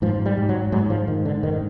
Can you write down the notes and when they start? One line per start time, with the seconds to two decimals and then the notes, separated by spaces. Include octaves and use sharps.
0.02 G#2 F3
0.26 G3
0.37 G#2
0.49 F#3
0.72 G#2 F#3
0.90 F3
1.08 G#2 D#3
1.25 D3
1.43 G#2 D#3